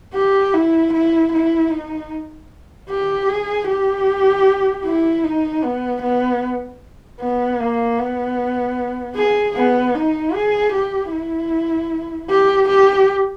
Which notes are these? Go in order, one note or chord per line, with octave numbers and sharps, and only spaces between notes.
G4
E4
E4
E4
D#4
G4
G#4
G4
E4
D#4
B3
B3
B3
A#3
B3
G#4
B3
D#4
G#4
G4
E4
G4
G4